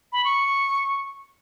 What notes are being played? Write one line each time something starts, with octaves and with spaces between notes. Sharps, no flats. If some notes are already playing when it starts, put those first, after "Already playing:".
B5
C#6